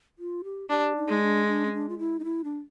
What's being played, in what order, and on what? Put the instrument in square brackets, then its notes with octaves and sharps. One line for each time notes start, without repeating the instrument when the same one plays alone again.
[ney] F4
G4
[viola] D4 [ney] G4
[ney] D#4
[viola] G#3
[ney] D4
D4
C#4
D4
F4
E4
D#4
E4
D4